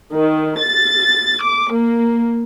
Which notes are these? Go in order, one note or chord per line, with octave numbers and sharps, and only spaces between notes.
D#3
A6
D6
A#3